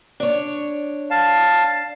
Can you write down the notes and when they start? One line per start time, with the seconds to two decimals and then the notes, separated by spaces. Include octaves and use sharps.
0.20 D4 C#5
1.11 F5 A5